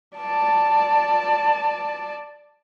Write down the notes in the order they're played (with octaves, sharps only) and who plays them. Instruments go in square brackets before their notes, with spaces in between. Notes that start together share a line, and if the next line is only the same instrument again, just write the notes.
[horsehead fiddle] D5 A5